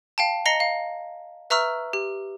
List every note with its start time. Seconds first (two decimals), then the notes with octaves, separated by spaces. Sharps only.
0.18 F5 G5 A5
0.46 D#5 A#5 A#6 C7 C#7 G7
0.60 F5
1.50 B4 E5 A#5 C#6 E6 F6
1.93 G4